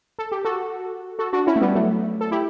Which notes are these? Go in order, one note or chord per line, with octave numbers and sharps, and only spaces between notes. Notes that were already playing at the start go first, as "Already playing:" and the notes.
A4
G4
F#4 A4
F#4 A4
D4 F#4
C#4 E4
A3
G3 B3
F#3 A3
A4
E4 G4